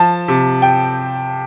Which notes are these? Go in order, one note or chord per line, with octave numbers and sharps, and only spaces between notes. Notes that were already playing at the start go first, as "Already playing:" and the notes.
Already playing: F3 A5
C3
G5